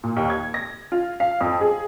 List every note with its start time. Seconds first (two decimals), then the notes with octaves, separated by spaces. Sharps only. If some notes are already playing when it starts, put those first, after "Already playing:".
0.04 A#2
0.17 D#2
0.30 G#6
0.54 A#6
0.92 F4
1.20 F5
1.41 F2
1.61 G#4